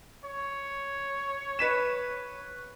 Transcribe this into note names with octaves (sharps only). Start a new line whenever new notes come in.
C#5
B4 B6 E7